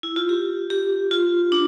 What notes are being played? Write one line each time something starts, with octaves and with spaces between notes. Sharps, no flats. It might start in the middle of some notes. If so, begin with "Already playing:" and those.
E4
F4
G4
G4
F4
D4